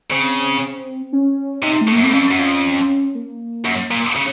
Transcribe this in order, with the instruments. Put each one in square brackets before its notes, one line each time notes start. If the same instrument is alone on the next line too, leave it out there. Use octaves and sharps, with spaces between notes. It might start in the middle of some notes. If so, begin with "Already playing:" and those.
[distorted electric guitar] C#3 [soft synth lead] C4
[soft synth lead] C#4
[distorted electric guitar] C3 [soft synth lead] D#4
[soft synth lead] A3
[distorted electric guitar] A2
[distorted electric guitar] F#2 [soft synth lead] A#3
[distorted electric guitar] A2 [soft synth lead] C4
[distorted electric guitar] F2 [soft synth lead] C#4
[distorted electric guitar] F#2
F2
[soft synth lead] A#3
[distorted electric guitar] F#2
A#2
C#3